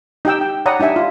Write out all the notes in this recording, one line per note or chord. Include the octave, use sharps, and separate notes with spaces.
D#4 G4 G5 E6
G5
C#5 D5 F#5 A#5 B5 D#6
D4 D#4 G4 E5 G#5
F4